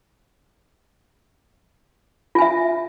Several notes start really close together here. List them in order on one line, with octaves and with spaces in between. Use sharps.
F4 G#5 E5